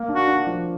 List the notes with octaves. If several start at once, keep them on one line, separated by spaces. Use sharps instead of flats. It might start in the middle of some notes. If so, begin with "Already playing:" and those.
Already playing: A#3
D4
F#4
D4
F3